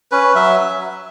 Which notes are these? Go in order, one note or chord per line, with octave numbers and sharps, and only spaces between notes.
C#4 B4
F#3 E5